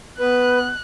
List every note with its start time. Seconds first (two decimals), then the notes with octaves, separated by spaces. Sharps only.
0.20 B3 B4 F#6